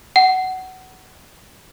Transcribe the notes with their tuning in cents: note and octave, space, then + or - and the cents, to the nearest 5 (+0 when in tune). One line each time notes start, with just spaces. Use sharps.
F#5 +15